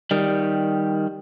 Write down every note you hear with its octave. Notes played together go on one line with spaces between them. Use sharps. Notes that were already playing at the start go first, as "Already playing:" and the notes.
D#3 G3